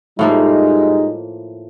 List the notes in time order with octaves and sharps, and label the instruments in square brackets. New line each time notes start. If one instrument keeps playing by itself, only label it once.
[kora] A2 F3 A#3 [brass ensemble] G3 G#3 D#4